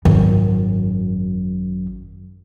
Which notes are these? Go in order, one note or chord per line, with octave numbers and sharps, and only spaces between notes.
G#1 F#2